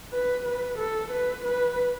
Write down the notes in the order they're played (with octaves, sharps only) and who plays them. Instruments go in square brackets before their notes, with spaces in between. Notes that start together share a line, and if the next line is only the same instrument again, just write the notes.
[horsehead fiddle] B4
B4
A4
B4
B4